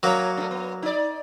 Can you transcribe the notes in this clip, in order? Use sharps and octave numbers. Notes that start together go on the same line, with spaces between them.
F#2 F#3 A#3 C#5
A3 B3 C#4
B3
D#4 D5